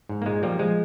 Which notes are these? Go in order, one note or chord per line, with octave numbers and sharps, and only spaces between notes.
G#2
A#3
A#2 G#3
F3 G3 A#3
F3 G#3